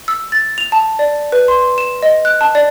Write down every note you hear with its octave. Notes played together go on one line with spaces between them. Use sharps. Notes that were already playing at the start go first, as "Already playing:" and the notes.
E6
A6
F7
A5
D5
B4
C6
E7
D#5
F#6
A5
D5